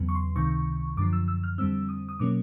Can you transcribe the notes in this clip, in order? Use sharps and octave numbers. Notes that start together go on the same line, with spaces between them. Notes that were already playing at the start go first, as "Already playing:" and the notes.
Already playing: E2 C#3 F#3 B3
C#6
C6
C#2 C3 D#3 C#6
F#2 D3 F3 D6
E6
E6
F6
F2 D3 G3 C4 E6
D#6
D#6
B2 F#3 A#3 C#4 D6